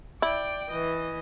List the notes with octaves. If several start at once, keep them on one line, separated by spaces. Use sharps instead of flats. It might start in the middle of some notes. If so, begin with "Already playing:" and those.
E4 D5 G5
E3 D#5